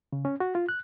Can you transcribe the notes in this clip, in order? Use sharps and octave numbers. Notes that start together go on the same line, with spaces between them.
C#3
C#4
F#4
F4
F#6